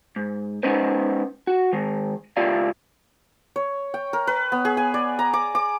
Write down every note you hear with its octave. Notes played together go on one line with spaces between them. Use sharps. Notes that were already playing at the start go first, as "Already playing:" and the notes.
G#2
G#3 B3 C#4 D#4 B4 C5
F#4
D#3 G#3
C#2 E4 F4 G4 D5 F5
C#5
G5
A#4
B4
B3
G#4
G#5
D5
A#5
D6
D6